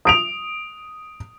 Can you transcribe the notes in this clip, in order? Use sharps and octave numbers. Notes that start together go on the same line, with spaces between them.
D#6 D7 F7